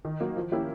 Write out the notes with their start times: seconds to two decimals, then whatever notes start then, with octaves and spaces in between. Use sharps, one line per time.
0.05 D#3
0.20 F#3 A#3
0.37 F3
0.52 A#3 C#4 E4 G4